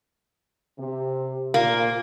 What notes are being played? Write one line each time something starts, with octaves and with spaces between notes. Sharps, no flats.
C3
A#2 A#3